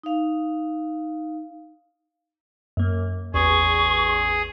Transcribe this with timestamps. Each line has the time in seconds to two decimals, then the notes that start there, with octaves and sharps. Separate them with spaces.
0.03 D#4 F5
2.77 F#2 A#3
3.34 A1 E2 G#4 C#6